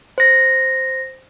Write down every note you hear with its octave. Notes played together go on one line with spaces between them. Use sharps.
C5 A#6